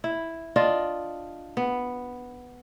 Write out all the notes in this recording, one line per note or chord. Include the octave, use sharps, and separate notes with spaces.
E4
D4 F4 D#5
B3